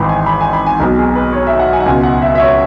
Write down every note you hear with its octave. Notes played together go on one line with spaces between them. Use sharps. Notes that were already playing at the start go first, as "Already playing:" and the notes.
Already playing: G#1 G#2 E3 B5
G#5
B5
G#5
B5
G#5
B1 B2
G#4
B4
C#5
E5
F#5
G#5
F#5
C#2 B2 G#5
F#5
E5
E5
C#5